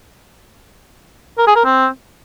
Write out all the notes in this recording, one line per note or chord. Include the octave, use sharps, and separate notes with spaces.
A#4
G#4
A#4
C4